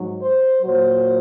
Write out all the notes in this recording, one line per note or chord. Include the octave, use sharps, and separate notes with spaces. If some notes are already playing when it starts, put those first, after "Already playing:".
Already playing: G#2 F#3
C5
A#2 F#3 C5